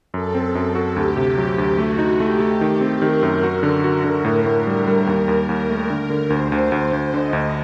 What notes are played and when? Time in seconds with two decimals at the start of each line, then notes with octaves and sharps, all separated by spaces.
0.14 F#2 A4
0.35 C4
0.55 F#2
0.75 F#4
0.96 D2 G4
1.17 C3
1.38 F#3
1.58 D2
1.78 A3 F#4
1.98 D#4
2.20 A3 G4
2.40 A3
2.61 D#3
2.81 C4
3.02 D#3 A#4
3.23 F#2
3.43 F#4
3.63 D3
3.84 F#4 A#4
4.04 D3
4.25 A2
4.46 A2
4.66 G3 A#4
4.87 G3
5.07 D#2
5.28 D#2
5.48 D#2 A#4
5.70 A3
5.90 D3
6.10 D3
6.30 D2 C5
6.52 D2
6.72 D2
6.93 D2
7.13 D3 D#5
7.33 D2